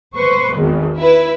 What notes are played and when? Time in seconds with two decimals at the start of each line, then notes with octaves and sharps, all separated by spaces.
0.15 B4 C5 C#6
0.56 G#1 E2 D#3
0.98 E4 B4